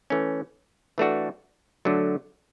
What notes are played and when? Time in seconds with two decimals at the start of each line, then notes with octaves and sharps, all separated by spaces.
0.10 E3 A3 C#4
0.98 E3 A3 D4 F#4 A4
1.85 D3 F#3 A3